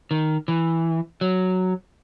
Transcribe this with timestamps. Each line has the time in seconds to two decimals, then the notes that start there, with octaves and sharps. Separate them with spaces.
0.11 D#3
0.48 E3
1.21 F#3